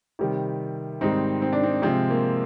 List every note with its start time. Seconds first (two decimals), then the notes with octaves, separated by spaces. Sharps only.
0.19 C3 D#3 G3
1.01 G#2 D#3 G3 C4 D#4
1.42 C4
1.53 D4
1.63 C4
1.82 C3 F3 G#3 C4
2.10 A#3